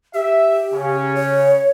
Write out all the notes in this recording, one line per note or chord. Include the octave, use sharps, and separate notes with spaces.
G4 E5
C#3 C#4
C#5